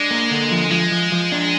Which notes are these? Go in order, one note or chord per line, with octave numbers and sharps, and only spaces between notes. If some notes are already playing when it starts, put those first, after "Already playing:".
Already playing: G#3 D4
A#3
D3
F3
F3 G#3
F3
F3
D4